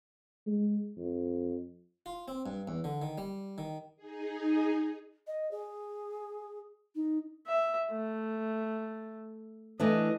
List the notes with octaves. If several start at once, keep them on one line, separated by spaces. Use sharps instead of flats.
G#3
F2
F4
C4
G2
E2
D3
D#3
G3
D#3
D#4 G#4
D#5
G#4
D#4
E5
A3
E3 A3 D4 D#5